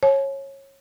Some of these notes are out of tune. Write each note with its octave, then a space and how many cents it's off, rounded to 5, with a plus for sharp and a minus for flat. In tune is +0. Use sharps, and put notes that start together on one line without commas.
C#5 -20 A5 -45